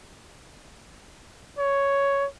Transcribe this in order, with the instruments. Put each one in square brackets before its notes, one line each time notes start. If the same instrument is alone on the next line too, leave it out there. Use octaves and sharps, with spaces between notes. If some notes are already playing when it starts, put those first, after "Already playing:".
[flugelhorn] C#5